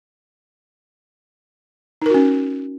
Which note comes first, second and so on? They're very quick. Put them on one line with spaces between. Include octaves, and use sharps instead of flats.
D#4 A#4 F#4 C#4